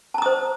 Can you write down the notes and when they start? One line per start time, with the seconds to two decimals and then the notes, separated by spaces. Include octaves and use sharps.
0.14 A5
0.18 A#5
0.22 D#6
0.26 C5